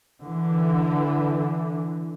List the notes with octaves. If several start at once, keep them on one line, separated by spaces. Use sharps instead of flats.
D3 E3